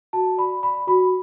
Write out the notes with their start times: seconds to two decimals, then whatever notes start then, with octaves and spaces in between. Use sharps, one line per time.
0.13 F#4 A5
0.38 D5 B5
0.63 D5 B5
0.87 F#4 B5